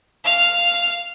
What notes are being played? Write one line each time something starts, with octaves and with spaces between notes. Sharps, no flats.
F5 F6